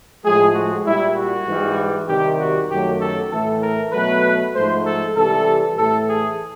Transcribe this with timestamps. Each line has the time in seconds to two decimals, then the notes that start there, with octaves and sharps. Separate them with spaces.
0.24 A2 F3 G#3 G#4
0.55 F#4
0.85 A#2 G3 E4
1.16 F#4
1.47 G#2 E3 G3
2.08 C3 D#3 G3 G4
2.39 F#4
2.69 F#2 D#3 F#3 A3 G4
3.01 A4
3.32 A2 E3 A3 A4
3.62 A#4
3.93 B2 F#3 A3 B4
4.54 G#2 F3 A3 C5
4.85 A4
5.16 C3 E3 G3 A4
5.77 A2 E3 A3 A4
6.08 G#4